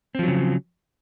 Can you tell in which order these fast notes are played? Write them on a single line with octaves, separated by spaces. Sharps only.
C4 F3 F#3 C#3